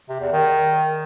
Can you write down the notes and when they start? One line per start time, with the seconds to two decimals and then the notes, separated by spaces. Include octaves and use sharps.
0.09 C3
0.21 E2
0.32 D#3